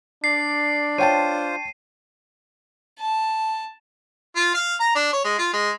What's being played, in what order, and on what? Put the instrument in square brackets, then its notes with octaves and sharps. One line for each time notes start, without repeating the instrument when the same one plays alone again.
[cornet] D4 [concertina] D5 [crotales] C7
[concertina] F4 C5 [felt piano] C#5 G5 A5 [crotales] D#7
[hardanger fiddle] A5
[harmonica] F4
F5
A#5
D4
C#5
G#3
F4
G#3